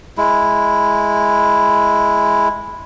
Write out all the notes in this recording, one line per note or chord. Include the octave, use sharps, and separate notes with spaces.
G#3 E4